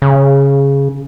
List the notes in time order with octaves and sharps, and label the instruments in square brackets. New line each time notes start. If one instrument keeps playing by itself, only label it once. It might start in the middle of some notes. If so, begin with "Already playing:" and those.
[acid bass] C#3